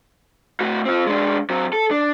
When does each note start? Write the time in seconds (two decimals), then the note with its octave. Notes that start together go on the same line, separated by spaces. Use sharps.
0.60 A2 F#4
0.85 C4 F4
1.07 G#3 D4
1.50 F#3 C4
1.73 A4
1.91 D4